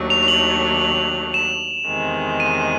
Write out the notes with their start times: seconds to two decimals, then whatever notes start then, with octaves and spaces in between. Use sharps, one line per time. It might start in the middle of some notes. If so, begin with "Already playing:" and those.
Already playing: D#2 D#3 F#3 A3 D4
0.10 F7
0.23 F7
0.28 F#7
1.34 E7
1.87 E2 C3 D#3 G#3
2.40 D#7